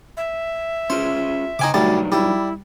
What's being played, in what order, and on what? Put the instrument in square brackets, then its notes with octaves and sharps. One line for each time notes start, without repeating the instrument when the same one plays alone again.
[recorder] E5
[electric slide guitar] C#4 F4 G#4 [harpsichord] C5
[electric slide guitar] C#3 G5 [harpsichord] D#4 G#5 D6
[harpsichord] D2 G3 A5 [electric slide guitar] F#3 D4 D#4
[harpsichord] G3 [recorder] E4